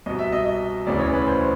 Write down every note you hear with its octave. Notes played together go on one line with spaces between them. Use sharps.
C2 B2 D#5
E5
D#5
D#5
E1 D2 C#3 E3 D5
C#5
B4
C5